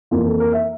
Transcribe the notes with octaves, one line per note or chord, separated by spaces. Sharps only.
F2 E3 A#3 F4
A4
A#4
E5